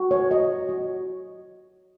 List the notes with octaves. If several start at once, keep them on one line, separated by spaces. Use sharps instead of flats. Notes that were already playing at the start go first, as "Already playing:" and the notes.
Already playing: F#4
C#5
F#4 D#5
F#4